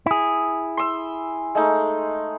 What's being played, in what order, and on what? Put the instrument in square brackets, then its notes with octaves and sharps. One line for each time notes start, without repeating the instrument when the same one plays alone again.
[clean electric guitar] E4 G#4
[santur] C6 E6
G#3 A3 D#4